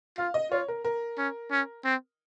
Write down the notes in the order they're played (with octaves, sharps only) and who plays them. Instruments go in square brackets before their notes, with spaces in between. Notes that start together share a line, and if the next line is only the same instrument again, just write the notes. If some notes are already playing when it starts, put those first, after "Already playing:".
[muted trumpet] F4 [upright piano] F5
[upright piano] D#5
[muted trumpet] F4 [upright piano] C#5
[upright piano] A#4
A#4
[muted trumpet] C#4
C#4
C4